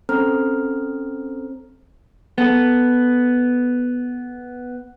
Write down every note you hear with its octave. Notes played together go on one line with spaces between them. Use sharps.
C4 C#4 A4 C5 A#5 F6
B3 A4